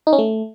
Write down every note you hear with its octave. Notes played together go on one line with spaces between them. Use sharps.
D#4
C#4
A3